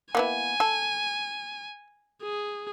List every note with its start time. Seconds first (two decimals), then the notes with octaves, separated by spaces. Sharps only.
0.15 A#3 B3 E4 G#5
0.60 A4
2.23 G#4